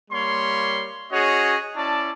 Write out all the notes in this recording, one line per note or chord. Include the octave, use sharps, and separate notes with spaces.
G3 A#3 C#5 C6
C#4 F#4 G#4 C#5 D#5
C#4 E4 D5 A5